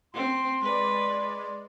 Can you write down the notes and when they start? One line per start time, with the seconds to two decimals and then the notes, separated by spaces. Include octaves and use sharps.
0.14 C4 C6
0.61 G#3 B4 D5